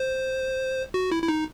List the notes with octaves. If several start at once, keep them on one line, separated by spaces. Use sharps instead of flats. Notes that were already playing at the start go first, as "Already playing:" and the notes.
Already playing: C5
F#4
E4
E4
D#4